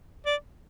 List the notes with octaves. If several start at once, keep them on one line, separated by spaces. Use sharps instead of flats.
D5